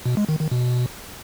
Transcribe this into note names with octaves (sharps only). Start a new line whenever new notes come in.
B2
G#3
D#3
D#3
B2